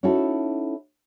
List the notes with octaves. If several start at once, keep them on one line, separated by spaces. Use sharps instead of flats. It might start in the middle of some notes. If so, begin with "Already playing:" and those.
C#4 D#4 E4 F#4 A4